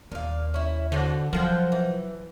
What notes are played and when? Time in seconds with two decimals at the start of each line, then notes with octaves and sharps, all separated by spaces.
0.12 D#2 A#2 F5
0.54 C#4 E4
0.92 D3 C4 F#4
1.33 F3 F#3 A#4 F#5 G5
1.72 E3